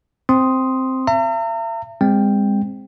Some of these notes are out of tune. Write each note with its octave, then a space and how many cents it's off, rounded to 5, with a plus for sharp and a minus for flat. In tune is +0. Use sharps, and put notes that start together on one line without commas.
C4 +0 C6 +0 D#6 +5
E5 +40 A#5 -40
G#3 -30 C4 +0 G5 +0